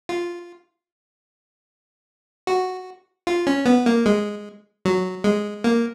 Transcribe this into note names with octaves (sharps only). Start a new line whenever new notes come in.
F4
F#4
F4
C#4
B3
A#3
G#3
F#3
G#3
A#3